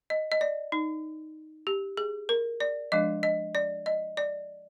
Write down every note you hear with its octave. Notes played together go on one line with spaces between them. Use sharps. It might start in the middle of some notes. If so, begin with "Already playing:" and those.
D#5
D#5
D5
D#4
G4
G#4
A#4
D5
F3 G#3 D4 D#5
D#5
D5
D#5
D5